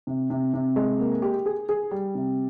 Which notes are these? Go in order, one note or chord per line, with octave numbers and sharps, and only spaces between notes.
C3
C3
C3
G#3
A#3
G4
G#4
G#4
G3
C3